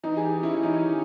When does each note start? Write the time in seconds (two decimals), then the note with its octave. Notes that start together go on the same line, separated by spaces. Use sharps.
0.03 E3 D#4
0.17 G#4
0.23 G4
0.43 C#4 E4
0.55 E4
0.63 D#4
0.83 D#3